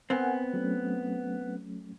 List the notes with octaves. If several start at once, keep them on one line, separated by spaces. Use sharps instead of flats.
B3 C4 A#4 F#5 G#5
F#3 A3 C#4